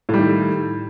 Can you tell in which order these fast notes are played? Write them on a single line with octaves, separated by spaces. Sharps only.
A2 G3 D#3